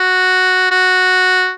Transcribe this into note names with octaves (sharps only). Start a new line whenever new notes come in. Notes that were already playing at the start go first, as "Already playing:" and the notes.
Already playing: F#4
F#4